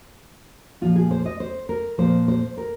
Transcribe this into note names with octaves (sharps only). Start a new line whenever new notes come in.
A#2 F3 F4
G#4
C5
D#5
C5
A#4
A#2 F3 C5
C5
A#4